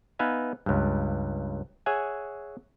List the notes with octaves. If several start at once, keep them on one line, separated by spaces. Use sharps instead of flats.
B3 D#4 B4 E5 F5 G#5
C#2 G2
G#4 C#5 E5 F#5 G#5